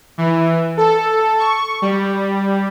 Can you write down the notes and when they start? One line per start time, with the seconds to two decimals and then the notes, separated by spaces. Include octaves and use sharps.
0.18 E3
0.77 A4
1.39 C#6
1.82 G3